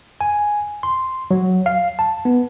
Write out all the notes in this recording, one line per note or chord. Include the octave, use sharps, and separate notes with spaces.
G#5
C6
F#3
F5
A5
B3